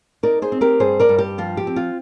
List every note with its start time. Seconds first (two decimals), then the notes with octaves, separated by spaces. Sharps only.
0.23 D#4 A#4 D5
0.42 G#4 C5
0.52 C4
0.61 G4 A#4
0.80 G2 G#4 C5
1.00 A#4 D5
1.09 G2
1.18 G4
1.38 F3 F4
1.57 G4
1.67 C4
1.76 F4